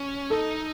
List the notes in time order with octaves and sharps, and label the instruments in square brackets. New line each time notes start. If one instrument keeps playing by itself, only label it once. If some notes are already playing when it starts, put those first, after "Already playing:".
Already playing: [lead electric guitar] C#4
[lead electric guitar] D#4 [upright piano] A4